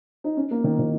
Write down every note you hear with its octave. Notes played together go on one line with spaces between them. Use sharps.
D#4
C#4
A#3
D#3
D#3